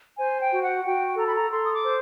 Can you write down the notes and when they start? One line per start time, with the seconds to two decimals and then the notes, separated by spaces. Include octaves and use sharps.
0.18 C5 G#5
0.40 G5
0.51 F#4
0.62 F#5
0.85 F#4 G5
1.17 A4 A#5
1.26 B5
1.35 A#5
1.51 A4 C6
1.64 D#6
1.73 D6
1.84 C5